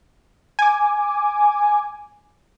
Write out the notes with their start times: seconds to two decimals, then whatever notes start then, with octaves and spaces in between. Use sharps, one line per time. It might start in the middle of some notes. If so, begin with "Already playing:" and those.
0.59 G#5 D6